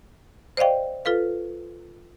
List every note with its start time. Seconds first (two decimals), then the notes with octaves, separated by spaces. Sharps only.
0.57 C5 D5 D#5 F5 G5
1.05 F4 A4 B4 F5